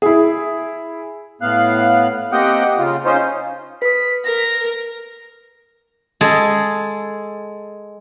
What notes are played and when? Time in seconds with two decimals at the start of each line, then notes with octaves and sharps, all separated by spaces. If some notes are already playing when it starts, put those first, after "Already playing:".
0.02 E4 G#4
1.41 A2 B3 F5 F#6
2.32 A#3 C4 G4 D#5 F#5 G5
2.78 C#3 F4
3.05 C#4 D#4 F4 C5
3.82 B4 D#6 B6
4.25 A#4 A#6
6.21 G#3 G#4 A4